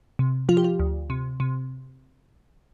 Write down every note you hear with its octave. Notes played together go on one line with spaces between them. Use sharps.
C3
F3 F4
G4
F4
D2
C3
C3